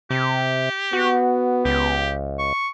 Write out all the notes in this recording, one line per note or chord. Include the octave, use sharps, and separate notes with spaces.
C3 G4
B3 F#4
C#2 G4
C#6